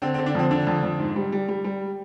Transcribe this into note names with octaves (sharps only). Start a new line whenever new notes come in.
D3 C4
C4
D3
D4
F2 C4
D3 D4
F2
F2
G#2
G3
G3
G3
G3